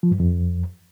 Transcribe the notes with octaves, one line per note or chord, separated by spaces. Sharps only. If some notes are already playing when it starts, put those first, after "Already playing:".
F3
G2
F2